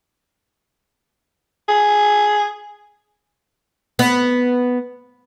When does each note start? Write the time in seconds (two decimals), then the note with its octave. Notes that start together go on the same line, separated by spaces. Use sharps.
1.69 G#4
3.99 B3